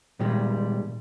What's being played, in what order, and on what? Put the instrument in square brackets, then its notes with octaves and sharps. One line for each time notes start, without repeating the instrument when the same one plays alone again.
[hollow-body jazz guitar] A#2 D#3 G3 G#3